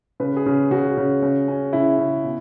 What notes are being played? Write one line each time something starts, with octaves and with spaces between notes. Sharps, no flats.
C#3 B4
G#4
C#3
C#3 F#4
C#3
C#3
C#4
C#3 E4
C#3
B2